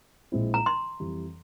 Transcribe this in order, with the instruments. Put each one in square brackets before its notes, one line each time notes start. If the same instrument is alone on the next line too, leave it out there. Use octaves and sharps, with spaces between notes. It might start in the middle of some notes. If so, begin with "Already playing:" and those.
[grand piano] A#1 A#2 G#3 C4 E4
[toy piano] A#5
C6
[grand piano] F2 E3 G3